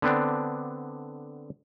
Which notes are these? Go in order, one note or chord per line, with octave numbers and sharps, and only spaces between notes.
D3 B3 C4 D4